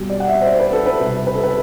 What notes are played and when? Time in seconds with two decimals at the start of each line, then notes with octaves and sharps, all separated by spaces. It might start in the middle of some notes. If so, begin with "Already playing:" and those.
Already playing: B2 G3
0.10 D5
0.20 F#5
0.28 E5
0.41 C5
0.46 D5
0.60 B4
0.73 A4
0.86 B4
1.00 C3 G3
1.27 B4
1.35 A4
1.43 B4